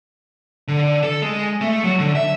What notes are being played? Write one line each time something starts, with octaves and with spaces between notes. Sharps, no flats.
D3
A4
G#3
A3
F#3
D3
E5